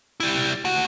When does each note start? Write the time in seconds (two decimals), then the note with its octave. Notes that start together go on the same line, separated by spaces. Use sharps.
0.20 G3 E4
0.65 A3 F#5